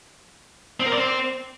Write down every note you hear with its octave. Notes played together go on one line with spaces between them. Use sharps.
C4
A#4
D5
C4